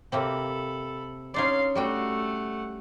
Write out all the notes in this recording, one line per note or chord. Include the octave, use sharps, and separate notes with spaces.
C3 A#3 C4 A4 B5
C#4 D#4 D5 F5 C6
G3 A3 F#4 F#5 G5